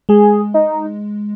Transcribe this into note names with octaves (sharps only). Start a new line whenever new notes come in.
G#3 G#4
D#4